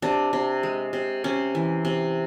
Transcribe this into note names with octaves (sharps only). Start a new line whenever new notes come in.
C3 D4
C3
G#3
C3
C3 C#4
E3
C3